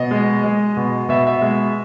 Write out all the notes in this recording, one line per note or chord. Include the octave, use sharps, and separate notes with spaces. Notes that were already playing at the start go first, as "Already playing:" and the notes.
Already playing: B2 D#5
G#3
G#3
B2
B2 E5
E5
G#3